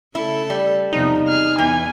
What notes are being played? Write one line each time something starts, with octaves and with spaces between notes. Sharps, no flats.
C#3 A3 E4 A4
G3
E2 C3 F3 D#4
G#4 F6
E2 E3 G#5